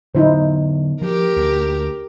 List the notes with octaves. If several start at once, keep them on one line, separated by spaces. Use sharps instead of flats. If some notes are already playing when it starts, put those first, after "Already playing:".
D3 F#3 B3 D#4 E4 C5
F3 G4 A#4
D2